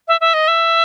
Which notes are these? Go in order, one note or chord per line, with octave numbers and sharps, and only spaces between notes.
E5
E5
D#5
E5